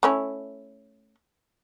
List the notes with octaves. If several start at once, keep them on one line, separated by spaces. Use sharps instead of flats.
A3 C#4 E4